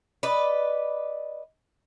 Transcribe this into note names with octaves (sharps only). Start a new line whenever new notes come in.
B4 D5 D#5